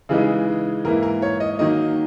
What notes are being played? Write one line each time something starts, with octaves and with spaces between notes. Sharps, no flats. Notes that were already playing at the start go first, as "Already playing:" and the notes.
C#3 E3 G#3 D#4 G#4
G#2 E3 A#3 E4 A#4
A#4
C#5
D#5
D#3 F#3 A#3 D#5